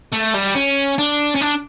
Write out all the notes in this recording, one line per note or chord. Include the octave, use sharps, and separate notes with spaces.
A3
G3
C#4
D4
C#4
D4